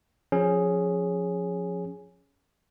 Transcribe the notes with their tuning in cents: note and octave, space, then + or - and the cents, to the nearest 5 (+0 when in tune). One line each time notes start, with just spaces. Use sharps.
F3 +20 C#4 +0 G#4 +0